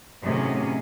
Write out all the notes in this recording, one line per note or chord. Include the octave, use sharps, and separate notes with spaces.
A2 C3 D#3 F#3 C#4 G#4